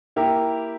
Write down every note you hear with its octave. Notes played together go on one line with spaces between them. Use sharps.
A#3 E4 G4 A#4